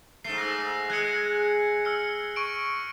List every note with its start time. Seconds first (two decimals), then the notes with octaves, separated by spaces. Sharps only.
0.24 G#2 A3 C7
0.38 E6 F#6 A#6
0.90 G#3 F#6 G#6 C#7
1.85 E6 F6 C#7
2.36 C#6 D7